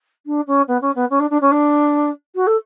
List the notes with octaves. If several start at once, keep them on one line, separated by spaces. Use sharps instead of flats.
D4
C#4
B3
C#4
B3
C#4
D4
D4
C#4
D4
F#4
A4